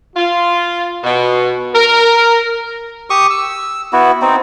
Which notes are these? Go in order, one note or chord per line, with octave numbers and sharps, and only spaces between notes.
F4
B2
A#4
G4 C#6 D#6
E6
B3 E4 F#4
C4 D#4